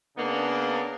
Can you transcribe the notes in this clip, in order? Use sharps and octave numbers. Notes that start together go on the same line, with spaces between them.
C#3 A#3 B3 D4